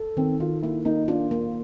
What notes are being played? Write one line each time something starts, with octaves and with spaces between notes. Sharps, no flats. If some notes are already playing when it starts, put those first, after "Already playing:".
Already playing: A4
D#3 C4
D#3 F4
A#3 E4
A#3 D#4
D4 F4
A#3